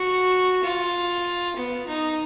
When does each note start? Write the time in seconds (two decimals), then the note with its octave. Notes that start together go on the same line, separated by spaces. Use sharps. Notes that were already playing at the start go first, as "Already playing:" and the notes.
Already playing: F#4
0.64 F4
1.57 B3
1.87 D#4